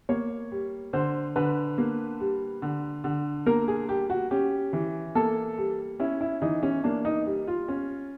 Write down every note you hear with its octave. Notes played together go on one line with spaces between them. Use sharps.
A#3 C#5
G3
D3 C5
D3 B4
A#3
G3
D3
D3
A#3 A#4
G#4
G3 G4
F#4
C#4 G4
E3
A#3 A4
G3
C#4 E4
E4
E3 D#4
C#4
A#3 D4
D#4
G3
F4
C#4